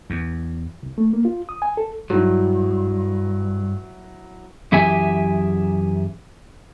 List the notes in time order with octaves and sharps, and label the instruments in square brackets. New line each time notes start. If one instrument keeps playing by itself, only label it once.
[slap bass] E2
[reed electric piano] C2
A3
A#3
F4
D#6
G#5
A4
[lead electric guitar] G2 [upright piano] F#3 E4
[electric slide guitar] F#2 E3 G4 G#4 E5 G#5